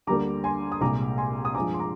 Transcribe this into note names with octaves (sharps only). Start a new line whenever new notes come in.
D2 D3 G3 A#3 A#5 D6
G#5 C6
D#6
C2 A#2 G#3 A#5 D6
G#5 C6
D#6
G2 F3 G#3 A#5 D6
C6
A#5 D6